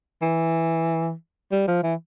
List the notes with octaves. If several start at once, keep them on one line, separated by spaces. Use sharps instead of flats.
E3
G3
F3
E3